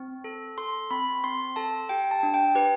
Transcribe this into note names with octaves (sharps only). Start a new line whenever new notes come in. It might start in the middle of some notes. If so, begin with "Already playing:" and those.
Already playing: C4
A4
A4 C6
C4 B5
C4 C6
A4 A5
G4 G5
A5
D4
G5
G4 B4